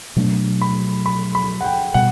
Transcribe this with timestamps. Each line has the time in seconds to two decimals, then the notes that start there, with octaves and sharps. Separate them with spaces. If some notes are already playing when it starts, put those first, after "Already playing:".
0.16 B2 F#3 A3 D4
0.62 B5
1.06 B5
1.35 B5
1.61 F#5
1.64 G5
1.94 B2 G3 F#5